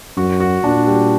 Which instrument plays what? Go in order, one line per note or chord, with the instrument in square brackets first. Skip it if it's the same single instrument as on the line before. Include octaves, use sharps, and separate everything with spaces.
[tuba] F#2 [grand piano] F#4
[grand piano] F#4
[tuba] A#2 [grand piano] D4
[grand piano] G3